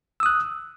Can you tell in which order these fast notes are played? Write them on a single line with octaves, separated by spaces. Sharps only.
E6 D#6 F#6